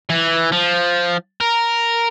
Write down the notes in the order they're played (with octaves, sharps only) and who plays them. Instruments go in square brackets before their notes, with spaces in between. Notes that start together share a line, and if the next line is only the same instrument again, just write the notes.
[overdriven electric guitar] E3
F3
A#4